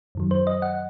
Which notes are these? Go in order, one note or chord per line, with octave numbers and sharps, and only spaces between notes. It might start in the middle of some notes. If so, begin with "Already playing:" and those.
F#2 D#3 F#3
C5
D#5
F#5